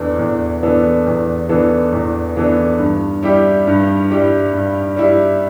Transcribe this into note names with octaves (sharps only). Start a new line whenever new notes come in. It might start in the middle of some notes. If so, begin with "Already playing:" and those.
Already playing: E2 E3 B3 D4 A4
E2
E3 B3 D4 A4
E2
E3 B3 D4 A4
E2
E3 B3 D4 A4
G2
G3 E4 G4
G2
G3 E4 G4
G2
G3 E4 G4